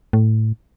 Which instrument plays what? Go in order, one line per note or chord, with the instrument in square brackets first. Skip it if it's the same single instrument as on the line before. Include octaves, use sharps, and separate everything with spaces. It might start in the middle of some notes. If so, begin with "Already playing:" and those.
[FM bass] A2